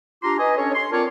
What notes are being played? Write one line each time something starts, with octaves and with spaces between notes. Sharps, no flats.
D4 F4 G4 A#5 C6 D6
B4 D#5 G#5
C#4 D4 A4 C#5
C6
C4 F4 A#4 C#5 D5 A5